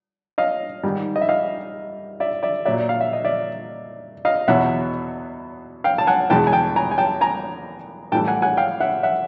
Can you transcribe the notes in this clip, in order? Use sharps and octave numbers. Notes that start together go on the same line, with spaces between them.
D#5 F5
G#2 D#3 G3
D#5
E5
D#5 F5
D5 E5
D5 E5
A#2 F#3 D5 E5
F5
E5
D#5
D5 E5
D#5 F5
E2 B2 F#3 E5 F#5
F5 G5
A5
F#5 G#5
E2 B2 G#3 G5 A5
G#5
G5 A5
G#5 A#5
G#5
G5 A5
G#5 A#5
A2 E3 G3 G5 A5
F#5 G#5
F#5 G#5
F5 G5
E5 F#5
E5 F#5